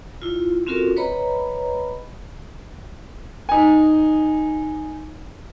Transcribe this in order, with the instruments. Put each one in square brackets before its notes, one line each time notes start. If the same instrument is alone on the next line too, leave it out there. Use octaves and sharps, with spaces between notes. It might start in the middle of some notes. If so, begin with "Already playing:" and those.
[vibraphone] E4 F4
C4 C#4 F4 F#4 A4 A#4
B4 C#5 D#5 A#5 B5
[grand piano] D#4 G#5